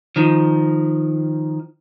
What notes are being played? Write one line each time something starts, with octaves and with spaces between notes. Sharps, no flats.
D#3 F3